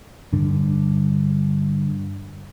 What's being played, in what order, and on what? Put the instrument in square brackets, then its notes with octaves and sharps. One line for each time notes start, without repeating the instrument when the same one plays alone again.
[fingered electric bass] G2 D3